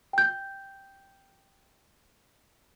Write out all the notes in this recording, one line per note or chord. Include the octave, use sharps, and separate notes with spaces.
G5 G6